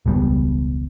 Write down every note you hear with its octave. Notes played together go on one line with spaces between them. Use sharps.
E1 C#2 B2 G3